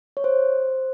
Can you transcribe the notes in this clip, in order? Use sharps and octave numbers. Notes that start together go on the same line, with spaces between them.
C#5
C5